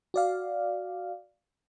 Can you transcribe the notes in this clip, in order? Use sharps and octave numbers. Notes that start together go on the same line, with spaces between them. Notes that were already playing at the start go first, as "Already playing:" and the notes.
F#4 D5 F5